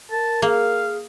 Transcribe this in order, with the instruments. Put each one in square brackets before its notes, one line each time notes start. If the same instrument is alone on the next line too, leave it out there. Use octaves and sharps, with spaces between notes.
[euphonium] A#4 [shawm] A5
[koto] A#3 [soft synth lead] G#4 [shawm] F5